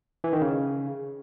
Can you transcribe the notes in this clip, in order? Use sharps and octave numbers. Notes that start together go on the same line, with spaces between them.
E3
D#3
C#3